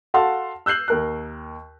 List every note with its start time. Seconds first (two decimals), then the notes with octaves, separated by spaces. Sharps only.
0.14 F#4 A4 F5 F#5 A5 C6
0.66 E6 F#6 G6 C7 F#7
0.88 D#2 A#4 F#6